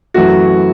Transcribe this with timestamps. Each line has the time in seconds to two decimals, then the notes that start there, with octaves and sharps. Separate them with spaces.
0.14 F#2 E3 A3 F#4